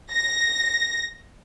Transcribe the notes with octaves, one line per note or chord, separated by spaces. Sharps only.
A#6